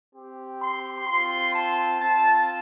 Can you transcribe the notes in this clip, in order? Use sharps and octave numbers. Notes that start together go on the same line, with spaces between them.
C4 G4
C6
C4 F4 C6
A5
C4 F4 A5